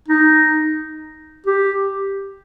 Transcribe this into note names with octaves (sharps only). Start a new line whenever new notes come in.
D#4
G4